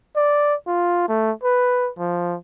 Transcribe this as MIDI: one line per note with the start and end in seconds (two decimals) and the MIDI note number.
0.16 0.55 74
0.67 1.04 65
1.09 1.32 57
1.44 1.91 71
1.99 2.37 53